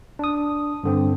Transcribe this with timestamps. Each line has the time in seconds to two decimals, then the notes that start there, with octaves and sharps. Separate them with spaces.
0.19 D4 D#6
0.83 G2 D3 C4